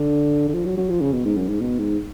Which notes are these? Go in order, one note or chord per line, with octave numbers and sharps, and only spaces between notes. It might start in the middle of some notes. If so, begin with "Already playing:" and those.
Already playing: D3
D3
F3
F#3
F#3
F3
C#3
B2
G#2
F#2
G#2
B2
G#2